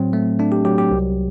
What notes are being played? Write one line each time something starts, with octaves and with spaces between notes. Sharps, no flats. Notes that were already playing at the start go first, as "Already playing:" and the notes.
Already playing: A2 F#3 C4
A3
A3 D4
G4
F#3 G4
G4
C2